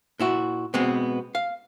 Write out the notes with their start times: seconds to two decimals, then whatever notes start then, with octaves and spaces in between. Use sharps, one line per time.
0.19 A#2 E4 F#4
0.74 B2 G#3 B3 C4
1.35 F5